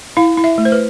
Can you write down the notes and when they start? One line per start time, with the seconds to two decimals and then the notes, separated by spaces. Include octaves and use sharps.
0.17 E4 F5
0.37 E4
0.44 E5
0.58 A3
0.65 C5
0.72 B4